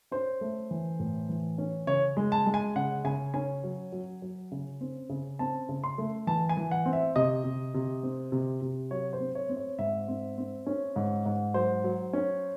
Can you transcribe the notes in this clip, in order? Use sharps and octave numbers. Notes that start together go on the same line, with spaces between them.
C#4 C5
A3
E3
A2
E3
C#4
C#3 C#5
G#3
A5
G#3
G#5
C#3 F#5
C#3 G#5
C#4 G#5
F#3
F#3
F#3
C#3
C4
C#3
C4 A5
C#3
C6
A3
E3 A5
G#5
E3
F#5
C4
E5
C3 D#5
C3
C3
C4
C3
C3
F#3 C#5
C5
C4
C#5
C4
C#5
G#2 E5
C4
C4
C#4
G#2
G#2
F#3 C5
F#3
C#4